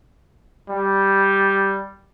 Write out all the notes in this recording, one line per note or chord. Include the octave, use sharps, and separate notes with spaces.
G3